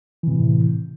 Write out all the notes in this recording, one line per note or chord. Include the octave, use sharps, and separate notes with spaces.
A2 C3 E3